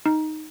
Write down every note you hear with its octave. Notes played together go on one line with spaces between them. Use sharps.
D#4